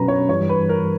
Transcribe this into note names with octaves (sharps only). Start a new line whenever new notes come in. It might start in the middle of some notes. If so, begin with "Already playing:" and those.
Already playing: B2 F#3 C#4 B4 A#5
C#5
G2 E3 G3 C#5
B4
A#4